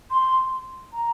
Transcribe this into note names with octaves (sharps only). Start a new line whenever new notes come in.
C6
A#5